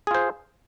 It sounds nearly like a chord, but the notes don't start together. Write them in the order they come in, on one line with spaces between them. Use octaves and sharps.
G#4 F4 C5